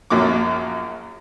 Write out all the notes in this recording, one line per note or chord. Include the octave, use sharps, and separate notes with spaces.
A#1 F#2 F#3 A#3 D6